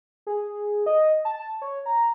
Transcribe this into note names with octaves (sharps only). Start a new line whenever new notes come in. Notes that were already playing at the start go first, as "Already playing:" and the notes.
G#4
D#5
A5
C#5
A#5